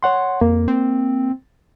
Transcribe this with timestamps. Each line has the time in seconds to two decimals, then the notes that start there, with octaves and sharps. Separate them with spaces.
0.03 C#5 F#5 C6
0.41 F2 A#3
0.68 C4